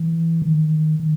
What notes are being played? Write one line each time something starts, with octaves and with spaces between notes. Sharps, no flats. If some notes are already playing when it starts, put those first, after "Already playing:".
Already playing: E3
D#3
D#3